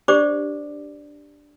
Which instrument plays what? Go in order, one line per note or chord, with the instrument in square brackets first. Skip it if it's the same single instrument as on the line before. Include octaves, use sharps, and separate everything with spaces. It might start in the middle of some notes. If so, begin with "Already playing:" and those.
[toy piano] D4 G4 C5 D5 D6